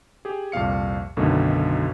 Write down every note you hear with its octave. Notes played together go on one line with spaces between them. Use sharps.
G4 G#4
C2 F2 A#2 F5 C#7
B1 F#2 B2 D3 D#3 A3